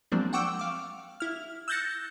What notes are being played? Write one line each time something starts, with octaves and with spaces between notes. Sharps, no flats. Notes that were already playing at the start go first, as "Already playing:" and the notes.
F3 F#3 G#3 A#3 C4 D4
F#5 G5 C#6 D6 E6
F5 D6
E4 F6
E6 F#6 G6 A6 A#6 C#7